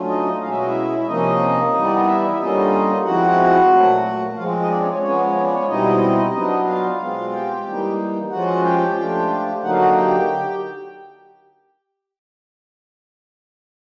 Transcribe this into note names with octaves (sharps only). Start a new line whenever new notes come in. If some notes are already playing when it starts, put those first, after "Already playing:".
Already playing: D3 F#3 A3 C#4 F4
D#4 D#5
B2 G#3 C#4 F5
E5
D#5
E4 E5
E5
C3 F3 A#3 C#4 D#4 D#5
E3 G3 B3
D5
D#5
E4 E5
E5
D3 G3 A#3 C#4 D#4 F4 D#5
F3 G#3 C4 E4 F#4 F#5
A#2 F#3 A3
F3 G#3 C4 F4 F5
D#4 D#5
D4 D5
C#4 C#5
C#4 C#5
F3 G#3 B3 C#4 C#5
C#5
D5
C#4 C#5
B2 G3 C4 D#4 E4 D#5
F#3 B3 D4 D#4 D#5
F4 F5
B2 G#3 C4 F4
G4 G5
E3 G3 A#3 D#4
F3 G#3 C#4 F4 F#4 F#5
G4 G5
F3 A3 D4 F4
D3 F#3 A#3 D#4 F#5
F5
F#4 F#5
G4 G5